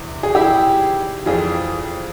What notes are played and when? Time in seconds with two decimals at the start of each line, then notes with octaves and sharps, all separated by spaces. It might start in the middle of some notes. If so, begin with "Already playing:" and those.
Already playing: E2 C3 E3
0.23 G#4
0.35 E4 G4
1.26 F2 E3 F4 G#4